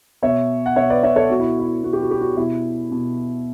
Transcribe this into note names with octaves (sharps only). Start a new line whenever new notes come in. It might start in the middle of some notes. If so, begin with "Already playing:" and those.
B2 C#5 E5
F#5
B2 C#5 E5
B4 D5
C#5 E5
A4 C#5
B2 F#4
E4
E4
B2 F#4
G4
F#4
G4
F#4
B2 E4
B2